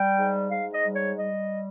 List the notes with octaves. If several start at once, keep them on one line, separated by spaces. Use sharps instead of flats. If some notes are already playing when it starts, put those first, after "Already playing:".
Already playing: G3 G5
G#2
G#2 F5
D#5
G3
C#5
G3 D#5